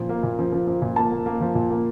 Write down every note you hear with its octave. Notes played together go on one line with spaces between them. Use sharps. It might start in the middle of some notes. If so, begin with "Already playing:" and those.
Already playing: A#2 F3
A#3
A#2
F3
F3
F3
A#2
A#3 A5
A#3
A#3
F3
A#2
A#3